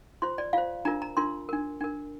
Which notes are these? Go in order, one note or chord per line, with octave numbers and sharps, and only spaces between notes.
F4 C5 C6
D5
F4 C5 F5
D4 F4 A#4 A#5
A#5
D4 F4 A#4 C6
D4 A#4
D4 A#4